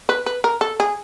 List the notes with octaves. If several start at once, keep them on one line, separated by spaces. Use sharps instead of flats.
B4
B4
A#4
A4
G#4